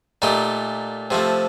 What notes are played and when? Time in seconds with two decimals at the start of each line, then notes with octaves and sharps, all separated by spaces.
0.22 A#2 A3 D#4 G4
1.11 C3 F3 A3